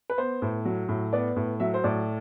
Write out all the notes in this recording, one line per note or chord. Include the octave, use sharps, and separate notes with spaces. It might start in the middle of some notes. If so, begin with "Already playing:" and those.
B4
B3 C5
A2
F#3
A2
B3 D5
A2
F#3 E5
C5
A2 D5